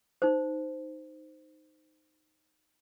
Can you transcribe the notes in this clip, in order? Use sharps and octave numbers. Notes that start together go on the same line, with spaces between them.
D#4 C5